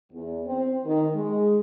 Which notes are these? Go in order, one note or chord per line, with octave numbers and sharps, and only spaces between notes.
E2
C4
D#3
G#3